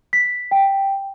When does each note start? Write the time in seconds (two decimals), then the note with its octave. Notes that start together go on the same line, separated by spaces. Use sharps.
0.13 B6
0.51 G5